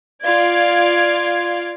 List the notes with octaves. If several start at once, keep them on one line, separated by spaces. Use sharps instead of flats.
F4 D5 F5 G#6